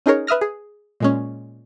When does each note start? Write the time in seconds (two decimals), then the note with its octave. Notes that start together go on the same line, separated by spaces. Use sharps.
0.06 C#4 D#4 G#4 A#4 C#5
0.27 B4 E5 D#6 F6 A#6
0.41 G#4
1.00 A#2 G#3 C#4